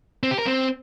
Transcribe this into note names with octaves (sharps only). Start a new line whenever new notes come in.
C4
G4
A#4
C4